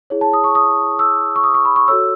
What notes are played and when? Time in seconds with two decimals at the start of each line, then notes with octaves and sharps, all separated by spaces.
0.10 E4 G#4 C#5
0.21 A5
0.33 D#6
0.44 C#6
0.55 D#6
0.99 E6
1.36 C#6
1.44 D#6
1.54 C#6
1.65 B5
1.76 C#6
1.88 F#4 A4 C#5 E6